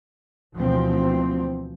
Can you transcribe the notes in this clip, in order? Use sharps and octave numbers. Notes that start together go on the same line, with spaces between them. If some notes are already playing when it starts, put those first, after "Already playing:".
D2 B2 E3 F3 C4